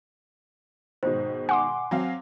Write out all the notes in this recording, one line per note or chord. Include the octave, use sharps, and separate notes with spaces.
G#2 B2 D#3 C5
F#5 G#5 C6 D6
F#3 C4 F5